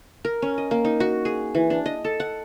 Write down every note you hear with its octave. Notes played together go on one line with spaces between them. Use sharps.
A#4
C#4
D#5
A#3
D#4
F#4
G#4
E3
D4
D#5
A4
F#5